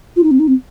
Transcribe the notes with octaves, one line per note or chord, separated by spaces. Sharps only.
F4
D#4
C4
D#4
C4